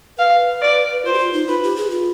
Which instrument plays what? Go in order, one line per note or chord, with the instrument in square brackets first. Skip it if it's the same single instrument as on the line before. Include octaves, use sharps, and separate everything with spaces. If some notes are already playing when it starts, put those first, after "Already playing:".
[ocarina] B4 [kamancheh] F5
[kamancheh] D5
[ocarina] F4 [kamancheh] C5
[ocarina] G4
F4
D#4
[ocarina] F4 [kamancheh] B4
[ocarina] G4
G#4
F4